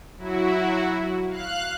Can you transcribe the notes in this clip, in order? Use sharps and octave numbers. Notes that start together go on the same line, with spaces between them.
F#3 E4 F#4
F5 F#6